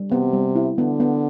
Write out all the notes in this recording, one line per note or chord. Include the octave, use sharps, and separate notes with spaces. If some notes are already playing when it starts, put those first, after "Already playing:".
Already playing: G3
C3 B3
G3
E4
D3 B3
B3